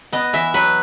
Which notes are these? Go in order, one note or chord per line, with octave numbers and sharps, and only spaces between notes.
B3 D#5
E3 E5
F#3 B4